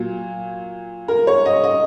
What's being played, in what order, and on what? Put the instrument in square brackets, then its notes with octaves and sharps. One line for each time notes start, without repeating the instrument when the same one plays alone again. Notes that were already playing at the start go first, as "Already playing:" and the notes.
Already playing: [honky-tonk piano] A#2 F#3
A#4
C#5
D#5
D#5